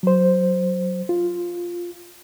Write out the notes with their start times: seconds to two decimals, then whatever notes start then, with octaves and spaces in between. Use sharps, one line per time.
0.03 F#3 C5
1.09 F4